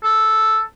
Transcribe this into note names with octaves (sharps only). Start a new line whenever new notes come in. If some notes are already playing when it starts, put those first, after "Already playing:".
A4